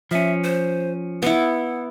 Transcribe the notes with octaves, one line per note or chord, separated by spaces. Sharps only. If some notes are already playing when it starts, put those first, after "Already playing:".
F3 C#4 E5
C5
B3 E4 F#5